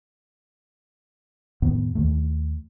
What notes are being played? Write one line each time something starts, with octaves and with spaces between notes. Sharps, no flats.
F2 A2 D#3 B3
D#2 D#3 A3